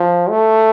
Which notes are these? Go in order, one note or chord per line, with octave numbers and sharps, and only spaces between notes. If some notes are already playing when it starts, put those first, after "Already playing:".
Already playing: F3
A3